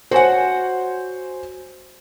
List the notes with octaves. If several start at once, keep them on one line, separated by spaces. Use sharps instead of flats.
F#4 C5 C#5 F#5 G#5